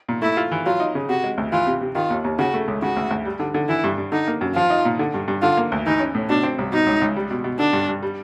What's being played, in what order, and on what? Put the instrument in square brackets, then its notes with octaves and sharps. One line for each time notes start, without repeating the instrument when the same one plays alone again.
[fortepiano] A#2
[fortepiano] A3 [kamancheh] E4
[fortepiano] F4
E3
[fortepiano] F#3 [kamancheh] F4
[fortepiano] D#4
C#3
[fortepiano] C3 [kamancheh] F#4
[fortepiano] G#3
D2
[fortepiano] E3 [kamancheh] F4
[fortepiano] C3
C3
[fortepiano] D#3 [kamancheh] F4
[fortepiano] D#2
D#2
[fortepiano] C#3 [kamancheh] F#4
[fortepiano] A3
C#2
[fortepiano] C#3 [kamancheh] F#4
[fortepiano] D2
D2
G3
D3
D3
[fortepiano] E3 [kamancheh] E4
[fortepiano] G2
G2
[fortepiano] D3 [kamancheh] D#4
[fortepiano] A#3
F#2
[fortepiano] F3 [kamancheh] F4
[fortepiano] D#4
A#2
D3
G2
G2
[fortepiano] D3 [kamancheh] F4
[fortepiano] A#3
D2
[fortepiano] E3 [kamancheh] D#4
[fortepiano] C#4
A2
[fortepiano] B2 [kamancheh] D4
[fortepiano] C4
C2
[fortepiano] B2 [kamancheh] D#4
[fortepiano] C#2
C#2
G3
B2
B2
[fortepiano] D3 [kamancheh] D4
[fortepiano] G2
G2
G3